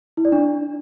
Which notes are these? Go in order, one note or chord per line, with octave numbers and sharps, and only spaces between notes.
E4
D5
D4